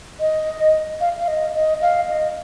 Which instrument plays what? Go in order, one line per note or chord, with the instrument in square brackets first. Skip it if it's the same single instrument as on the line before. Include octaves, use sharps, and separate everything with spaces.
[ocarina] D#5
F5
F5
D#5
D#5
F5
D#5